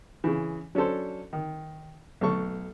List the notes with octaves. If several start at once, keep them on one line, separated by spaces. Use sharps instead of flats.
C#3 E3
F#3 C#4 D4 A4 C5
D#3
B1 A3 A4 C#6